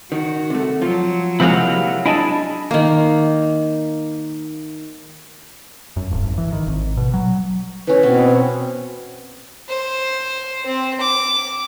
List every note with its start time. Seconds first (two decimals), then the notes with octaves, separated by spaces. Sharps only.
0.12 D#3 F#4
0.50 C3 A3
0.82 F3 F#3 F4
1.40 C3 F3 G#3 A#3 E4 F#4 G4 F5
2.06 D4 E4 G#4 D#5 G#5 A5
2.71 D#3 A#3
5.96 F#2
6.11 D1
6.23 G#1
6.38 E3
6.52 D#3
6.67 G#1
6.97 B2
7.14 F#3
7.87 E3 C#4 B4
8.03 B2 B3 C4
9.69 C5
10.66 C4
11.01 D6